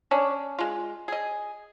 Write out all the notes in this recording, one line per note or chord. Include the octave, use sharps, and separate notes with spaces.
C#4 D4
G#3 F4
G#4 D#5